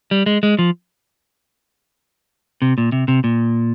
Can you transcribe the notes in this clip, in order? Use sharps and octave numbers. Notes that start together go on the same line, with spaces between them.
G3
G#3
G#3
F3
C3
A#2
C3
C3
A#2